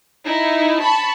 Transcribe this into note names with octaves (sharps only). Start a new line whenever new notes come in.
D#4 E4
A5 B5 C#6